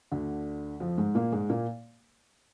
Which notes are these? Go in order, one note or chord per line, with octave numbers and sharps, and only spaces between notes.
D2 D3
F2 F3
G#2 G#3
A#2 A#3
G#2 G#3
A#2 A#3